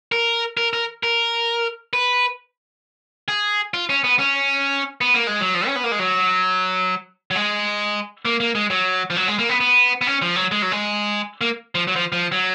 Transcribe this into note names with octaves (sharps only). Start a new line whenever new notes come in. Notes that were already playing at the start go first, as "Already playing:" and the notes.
A#4
A#4
A#4
A#4
B4
G#4
F4
C#4
B3
C#4
B3
A#3
G#3
F#3
F3
C#4
B3
A#3
G#3
F#3
F#3
G#3
A#3
A#3
G#3
F#3
F3
F#3
G#3
A#3
B3
B3
B3
C#4
F3
F#3
G#3
F#3
G#3
A#3
F3
F#3
F3
F3
F#3